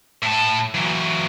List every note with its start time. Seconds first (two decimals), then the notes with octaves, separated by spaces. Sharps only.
0.22 A2 A5
0.74 E3 F#3